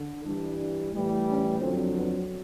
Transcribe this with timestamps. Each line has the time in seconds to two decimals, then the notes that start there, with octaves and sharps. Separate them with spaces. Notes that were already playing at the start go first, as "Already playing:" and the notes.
Already playing: D3
0.25 G2 E3 G3 D4
0.93 A2 E3 G3
1.26 C#4
1.60 F2 D3 F#3 C4
1.94 B3